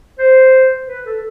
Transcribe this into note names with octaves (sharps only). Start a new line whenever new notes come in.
C5
B4
A4